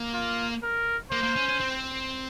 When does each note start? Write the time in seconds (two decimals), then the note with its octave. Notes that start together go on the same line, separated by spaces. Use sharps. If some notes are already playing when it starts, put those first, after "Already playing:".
Already playing: A#3
0.14 F4
0.63 A#4
1.11 A#3 C5
1.23 A#3
1.36 C#4
1.48 C#4
1.60 C4